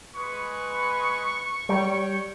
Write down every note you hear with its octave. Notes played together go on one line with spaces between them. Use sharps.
G#3 B4 C#6
G3 C#5 G5